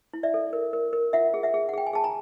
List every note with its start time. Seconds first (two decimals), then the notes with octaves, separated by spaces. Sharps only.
0.14 E4
0.23 D5 E5
0.34 A4
0.53 A#4
0.73 A#4
0.93 A#4
1.13 F4 E5 F#5
1.34 G#4
1.43 E5 F#5
1.54 G#4
1.69 F#5
1.73 G#4 G5
1.87 G#5
1.93 G#4 A5
2.04 G#5 A#5